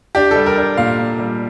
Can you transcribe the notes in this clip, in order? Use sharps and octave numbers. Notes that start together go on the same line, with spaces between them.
D4 G4
G3 A4
A#4
D4
A#2 F5
A#2
G3